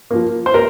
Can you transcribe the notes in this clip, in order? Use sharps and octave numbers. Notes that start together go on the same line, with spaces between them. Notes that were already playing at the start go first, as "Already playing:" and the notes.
F3 A#3
C5
A#4